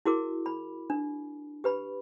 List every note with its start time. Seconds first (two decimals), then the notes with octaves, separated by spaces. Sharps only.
0.06 E4 F#4 G#4 A#4 D6
0.46 B5
0.90 D4
1.64 G4 B4 B5